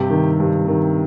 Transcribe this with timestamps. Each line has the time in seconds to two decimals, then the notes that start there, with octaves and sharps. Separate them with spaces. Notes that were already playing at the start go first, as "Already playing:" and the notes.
Already playing: G2 C3 G4
0.10 D#3
0.40 G2
0.68 D#3